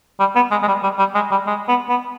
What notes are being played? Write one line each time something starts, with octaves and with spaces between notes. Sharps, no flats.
G3
B3
G#3
G#3
G3
G3
G3
G#3
G3
G#3
B3
B3